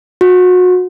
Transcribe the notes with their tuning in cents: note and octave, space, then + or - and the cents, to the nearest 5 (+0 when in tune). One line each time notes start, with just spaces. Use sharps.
F#4 -30